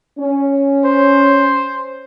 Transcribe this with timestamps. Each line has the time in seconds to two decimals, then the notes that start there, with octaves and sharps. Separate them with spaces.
0.19 C#4
0.85 C5